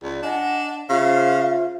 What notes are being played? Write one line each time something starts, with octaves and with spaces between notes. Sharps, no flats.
C#2 D5
D4 D#5 F#5 G#5
C#3 F4 C5 E5 F5